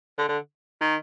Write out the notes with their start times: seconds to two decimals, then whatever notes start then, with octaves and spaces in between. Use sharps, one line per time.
0.18 D3
0.28 D3
0.81 D#3